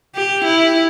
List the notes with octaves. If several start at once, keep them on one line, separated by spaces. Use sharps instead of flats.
G4
E4